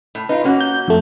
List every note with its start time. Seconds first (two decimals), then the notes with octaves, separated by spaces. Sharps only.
0.15 A2
0.29 D#4 F4 B4
0.44 A#3 C#4 F#4
0.61 G6
0.88 F2 A3